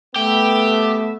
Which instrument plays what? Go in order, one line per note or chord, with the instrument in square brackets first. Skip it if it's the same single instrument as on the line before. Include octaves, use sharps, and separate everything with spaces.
[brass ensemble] A3 B3 E5 [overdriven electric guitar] G4